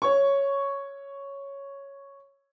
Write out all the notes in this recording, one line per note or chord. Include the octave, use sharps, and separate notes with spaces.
C#5 C#6